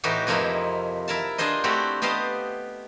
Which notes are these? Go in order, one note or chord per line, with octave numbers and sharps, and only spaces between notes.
A2 E3 D#4 F#4 G4
F2 C3 F3 A#3 D#4 E4
E4 A#4 A5
D4 F4 G#4 C5 D#5
A3 C4 E4 F#4 G4
B3 G4 C5 D#5 F5 A5